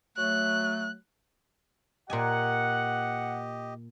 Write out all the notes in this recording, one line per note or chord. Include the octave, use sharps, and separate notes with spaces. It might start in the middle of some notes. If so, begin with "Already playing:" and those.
F#3 A3 F#6
A#2 G4 D#5 F#5 G#5